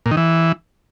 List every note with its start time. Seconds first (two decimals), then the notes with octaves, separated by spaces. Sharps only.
0.06 A#2
0.11 D#3
0.17 E3